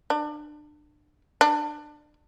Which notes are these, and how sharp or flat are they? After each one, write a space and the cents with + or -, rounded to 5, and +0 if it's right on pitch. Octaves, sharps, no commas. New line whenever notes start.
D4 +30
D4 +25